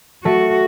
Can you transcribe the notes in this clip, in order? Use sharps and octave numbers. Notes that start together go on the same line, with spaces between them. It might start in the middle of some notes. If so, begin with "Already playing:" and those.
A3 F#4